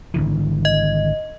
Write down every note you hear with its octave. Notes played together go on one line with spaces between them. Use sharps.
G#1 D3 E3
D#5